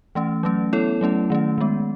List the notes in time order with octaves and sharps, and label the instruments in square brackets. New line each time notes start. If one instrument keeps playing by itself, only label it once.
[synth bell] E3 A3 C#4
F#3 A3 C#4
B3 E4 A4 C#5
F#3 A3 C#4 E4
D#3 A3 C#4
D#3 G#3 B3